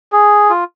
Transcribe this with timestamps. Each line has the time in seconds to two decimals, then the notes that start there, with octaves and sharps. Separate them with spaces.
0.12 G#4
0.50 F4